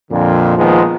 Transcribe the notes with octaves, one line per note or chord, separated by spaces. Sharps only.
F2 A#2 D3
A#2 D#3 F3 G#3 A#3 B3